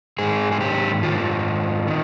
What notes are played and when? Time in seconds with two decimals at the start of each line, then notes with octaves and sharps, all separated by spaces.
0.19 G#2 D#3 G#4
0.52 G#4
0.61 G4
1.02 G#2 D#3 F4
1.87 D#3